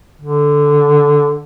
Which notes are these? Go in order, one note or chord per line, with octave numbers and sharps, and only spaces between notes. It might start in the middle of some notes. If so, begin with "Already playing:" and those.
D3